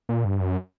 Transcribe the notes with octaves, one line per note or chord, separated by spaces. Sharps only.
A#2
G2
F#2